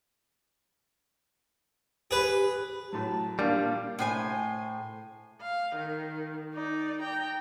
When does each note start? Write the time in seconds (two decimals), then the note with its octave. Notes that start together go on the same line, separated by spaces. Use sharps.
2.11 G4 G#4 B4
2.93 A2 F#3 A5
3.39 A#2 G3 A#3 D4 F5 G5
3.99 A2 C5 G#5
5.42 F5
5.75 D#3
6.54 D#4 D5
7.02 G5 A#5